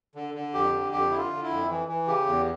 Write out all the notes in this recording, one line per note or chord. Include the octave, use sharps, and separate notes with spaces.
D3
D3
F2 G4
D3
F2 G4
D3 E4
F4
D3
E4
F2
E3
E3
C#3 G4
E2